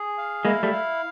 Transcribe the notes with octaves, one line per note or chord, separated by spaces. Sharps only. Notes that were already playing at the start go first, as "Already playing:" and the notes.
Already playing: G#4
F5
G#3 A#3 E4
G3 A3
F5